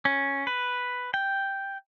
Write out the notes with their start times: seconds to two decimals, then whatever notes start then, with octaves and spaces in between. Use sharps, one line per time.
0.05 C#4
0.47 B4
1.14 G5